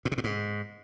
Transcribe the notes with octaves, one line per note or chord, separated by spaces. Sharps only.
A2
C3
A2
G#2